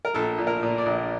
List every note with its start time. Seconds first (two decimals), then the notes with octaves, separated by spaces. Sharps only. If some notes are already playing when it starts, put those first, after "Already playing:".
0.05 A#4
0.15 A#1 A4
0.38 A#2
0.47 A#4
0.63 A#2
0.78 D5
0.86 A#1